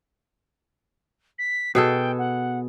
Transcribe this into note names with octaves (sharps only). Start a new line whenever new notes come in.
B6
B2 G#4 A4 G5
F#5